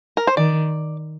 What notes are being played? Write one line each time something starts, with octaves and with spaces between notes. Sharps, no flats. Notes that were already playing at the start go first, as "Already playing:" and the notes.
A#4
C5
D#3 D5